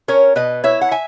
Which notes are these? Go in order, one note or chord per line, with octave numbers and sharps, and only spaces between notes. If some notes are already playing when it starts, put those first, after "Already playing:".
C#4 A#4 C#5
B2 B4 D#5
E4 C#5 E5
F#5
E5 G#5